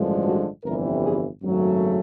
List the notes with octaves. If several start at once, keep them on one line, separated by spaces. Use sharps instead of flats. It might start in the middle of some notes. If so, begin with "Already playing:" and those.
Already playing: A1 G2 D3 F3 G#3
F#4
G1 F2 C3 E3 G3 A#4
G#4
G#1 F#2 C#3 F#3 A3